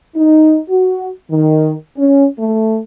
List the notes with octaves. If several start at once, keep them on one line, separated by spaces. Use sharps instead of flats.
D#4
F#4
D#3
C#4
A3